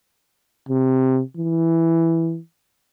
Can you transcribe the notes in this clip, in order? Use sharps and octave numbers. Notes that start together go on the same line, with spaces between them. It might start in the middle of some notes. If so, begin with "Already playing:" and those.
C3
E3